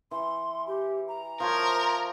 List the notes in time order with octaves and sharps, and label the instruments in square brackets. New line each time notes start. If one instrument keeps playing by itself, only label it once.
[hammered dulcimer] E3 [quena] C6
[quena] G4
A#5
[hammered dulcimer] F3 C5 C#5 [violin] A#4